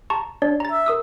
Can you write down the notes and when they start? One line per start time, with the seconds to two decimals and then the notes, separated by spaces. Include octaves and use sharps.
0.10 A5 A#5 C#6
0.42 D4 C#5 D5
0.60 A#5 A6
0.72 E5
0.86 A#4 D#6 E6